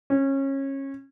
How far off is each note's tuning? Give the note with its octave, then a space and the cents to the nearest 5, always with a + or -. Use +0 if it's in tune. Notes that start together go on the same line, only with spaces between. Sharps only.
C#4 -25